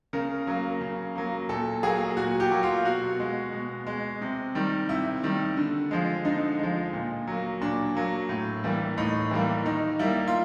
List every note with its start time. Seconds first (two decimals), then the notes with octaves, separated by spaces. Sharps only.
0.13 C#3 A#4
0.47 F#3 A#3
0.81 C#3
1.16 F#3 A#3
1.49 A#2 A4
1.83 F#3 A#3 G#4
2.17 A#2 F#4
2.40 G4
2.52 F#3 A#3
2.63 F4
2.85 B2 F#4
3.20 G#3
3.53 B2
3.87 G#3
4.21 C3
4.55 D#3 G3
4.89 C3 E4
5.23 D#3 G3
5.57 D3
5.91 F3 G#3
6.25 D3 D#4
6.59 F3 G#3
6.93 A#2
7.27 F#3 A#3
7.61 A#2 D4
7.95 F#3 A#3
8.29 A2
8.63 E3 G3 A#3
8.98 A2 D#4
9.31 E3 G3 A#3
9.65 D#3 D#4
9.99 G3 A#3 E4
10.28 F4